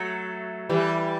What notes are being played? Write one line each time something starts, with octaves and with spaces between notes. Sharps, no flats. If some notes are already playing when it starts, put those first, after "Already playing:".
Already playing: F#3 A3
E3 G3